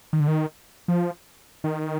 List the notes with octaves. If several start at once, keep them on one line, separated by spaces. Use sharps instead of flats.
D#3
D3
D#3
F3
D#3